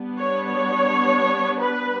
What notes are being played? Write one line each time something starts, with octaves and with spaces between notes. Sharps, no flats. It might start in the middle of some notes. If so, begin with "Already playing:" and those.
Already playing: G3 B3 D4
C#5
C#5
B4